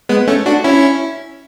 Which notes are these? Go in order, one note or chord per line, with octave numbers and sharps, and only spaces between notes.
G#3 B3
A3 C#4
D4 F#4
C#4 E4